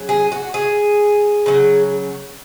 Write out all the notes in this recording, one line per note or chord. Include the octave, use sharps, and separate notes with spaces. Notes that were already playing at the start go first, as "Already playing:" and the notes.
Already playing: C#3 F#3
G#4
F#4
G#4
C#3 F#3